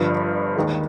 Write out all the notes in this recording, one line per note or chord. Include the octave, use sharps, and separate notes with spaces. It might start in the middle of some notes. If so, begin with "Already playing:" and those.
Already playing: G1 G2 F3
D#2 D#3 G#3